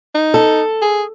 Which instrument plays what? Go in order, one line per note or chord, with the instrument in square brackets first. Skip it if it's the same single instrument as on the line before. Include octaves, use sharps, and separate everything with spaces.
[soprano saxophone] D#4
[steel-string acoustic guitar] A4
[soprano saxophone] G#4